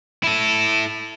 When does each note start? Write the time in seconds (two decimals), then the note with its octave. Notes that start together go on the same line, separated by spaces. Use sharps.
0.24 E4 A4